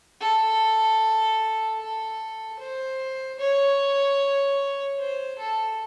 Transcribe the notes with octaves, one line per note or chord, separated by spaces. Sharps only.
A4
A4
C5
C#5
C5
A4